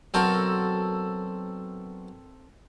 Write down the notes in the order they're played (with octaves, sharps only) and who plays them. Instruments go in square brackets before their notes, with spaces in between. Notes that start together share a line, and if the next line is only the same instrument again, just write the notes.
[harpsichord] B1 F#4 F5 [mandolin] C4 A4 A#4